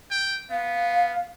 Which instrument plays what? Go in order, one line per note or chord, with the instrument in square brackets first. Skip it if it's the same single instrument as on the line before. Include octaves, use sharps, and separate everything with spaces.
[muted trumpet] G5
[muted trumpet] B3 [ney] F5